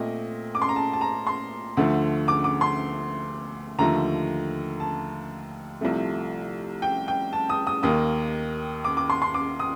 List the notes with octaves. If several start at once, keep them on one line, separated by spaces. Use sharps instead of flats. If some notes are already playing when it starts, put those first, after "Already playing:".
Already playing: A#2 A3 C4 D#5
D6
C6
A#5
A5
A5
A#5
C6
D2 D3 F3 A3
D6
D6
C6
D#2 D3 F3 A3 A#5
A5
C2 C3 F3 A3
G5
G5
A5
D#6
D#6
D#2 D#3 A#3 D#6
D6
D6
C6
C6
D6
D#6